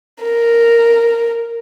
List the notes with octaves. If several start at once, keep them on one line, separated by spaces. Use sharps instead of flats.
A#4